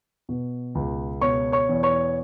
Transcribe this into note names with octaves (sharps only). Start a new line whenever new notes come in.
B2
C#2
B2 C#5 C#6
C#5 C#6
E2
C#5 C#6